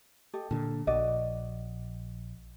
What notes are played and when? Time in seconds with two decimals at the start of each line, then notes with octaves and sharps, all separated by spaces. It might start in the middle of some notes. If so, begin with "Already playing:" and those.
0.34 G4 A4 D#5
0.51 A#2 D3 A4
0.87 A#1 F#4 D5 D#5